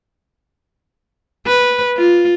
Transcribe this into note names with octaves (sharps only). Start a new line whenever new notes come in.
B4
F4